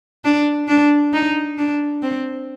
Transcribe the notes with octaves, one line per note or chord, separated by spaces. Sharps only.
D4
D4
D#4
D4
C4